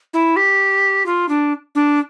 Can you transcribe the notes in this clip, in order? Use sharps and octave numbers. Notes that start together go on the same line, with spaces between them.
E4
G4
F4
D4
D4